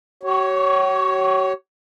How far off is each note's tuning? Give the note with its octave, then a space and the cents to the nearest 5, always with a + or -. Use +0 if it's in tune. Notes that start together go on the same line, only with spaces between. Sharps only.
F#4 +45 C#5 +0